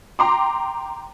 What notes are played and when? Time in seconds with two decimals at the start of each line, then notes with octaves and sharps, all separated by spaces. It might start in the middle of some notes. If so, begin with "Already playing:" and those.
0.19 G5 A#5 C6 D6